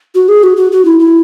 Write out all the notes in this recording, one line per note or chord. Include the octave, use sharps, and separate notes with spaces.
F#4
G#4
F#4
F#4
F#4
E4
E4